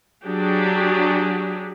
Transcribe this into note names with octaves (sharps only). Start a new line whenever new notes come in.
F#3 D4 G4 G#4